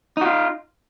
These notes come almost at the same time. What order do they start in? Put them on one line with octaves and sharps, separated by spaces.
D#4 F#4 F4